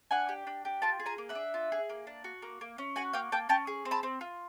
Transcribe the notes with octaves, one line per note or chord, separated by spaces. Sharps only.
D4 F#5 G#5
G4
D4
G4
F4 G5 A5
G#4
G#5 A#5
A#3
E5 F#5
D4
F4
G#4
A#3
D4
F#4
A#3
A#3
C#4
F#4 F#5 G#5
A#3 F5 G5
A#3 G5 A5
C#4 G5 A5
G#4
C4
A5 B5
C4
F4